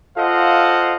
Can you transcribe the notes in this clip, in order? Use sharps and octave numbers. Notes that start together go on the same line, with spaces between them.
F4 A4 C5 D#5 F5 F#5